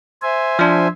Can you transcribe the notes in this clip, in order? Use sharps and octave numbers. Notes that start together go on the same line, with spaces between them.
C5 E5 G#5
F3 D4